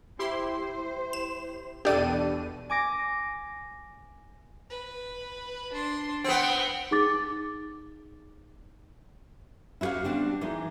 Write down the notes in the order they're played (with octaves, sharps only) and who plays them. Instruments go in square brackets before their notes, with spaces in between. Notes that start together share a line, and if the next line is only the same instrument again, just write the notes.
[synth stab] E4 G4 C6 [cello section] C5
[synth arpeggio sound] E7
[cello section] E2 B2 B3 [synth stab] D4 A4 D#7 [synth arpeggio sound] G4 D5
[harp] G#5 D6 A#6
[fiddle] B4
D4 C6
[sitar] B3 C4 [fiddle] F#5 G5
[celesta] D#4 G#4 D6 A6
[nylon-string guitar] E4 F#4 G4 B4 F5
G3 B3 C4 D4 F#4
E3 G#3 D#4